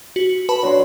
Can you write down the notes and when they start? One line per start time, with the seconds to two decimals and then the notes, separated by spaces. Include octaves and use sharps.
0.16 F#4
0.49 B4 A5 B5
0.63 F#3 D4 C6